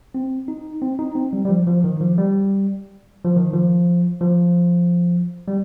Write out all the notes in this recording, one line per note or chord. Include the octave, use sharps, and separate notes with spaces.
C4
D#4
C4
D#4
C4
G3
G3
F3
F3
D#3
F3
G3
F3
D#3
F3
F3
G3